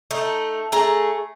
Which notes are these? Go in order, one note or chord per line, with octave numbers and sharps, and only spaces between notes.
A3 D#4
A3 G#4 A#5